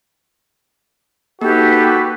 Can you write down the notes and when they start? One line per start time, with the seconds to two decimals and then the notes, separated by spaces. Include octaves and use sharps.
1.41 A#3 D#4 F#4 G4 A4 B4